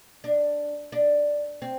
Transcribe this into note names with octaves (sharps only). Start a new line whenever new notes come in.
D4
D4
C4